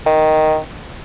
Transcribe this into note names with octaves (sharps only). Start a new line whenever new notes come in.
D#3